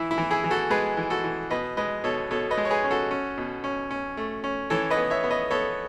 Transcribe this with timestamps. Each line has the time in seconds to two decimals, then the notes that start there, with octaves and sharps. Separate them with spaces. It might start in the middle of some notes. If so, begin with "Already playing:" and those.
Already playing: E3 E4
0.11 E4
0.18 E3
0.31 E4 G#4
0.44 E3
0.51 F#4 A4
0.70 G#3 G#4 B4
0.97 E3
1.10 F#4 A4
1.24 E3
1.50 B2 B4 D#5
1.77 G#3 B4 D#5
2.04 B2 A4 C#5
2.31 B2 A4 C#5
2.51 B4 D#5
2.57 G#3
2.65 C#5
2.70 G#4 B4
2.84 C#4
2.91 F#4 A4
3.11 C#4
3.37 B2
3.64 C#4
3.91 C#4
4.17 A3
4.44 C#4
4.70 E3 A4 C#5
4.90 B4 D#5
4.97 B3
5.10 C#5 E5
5.24 B3
5.30 B4 D#5
5.51 B3 A4 C#5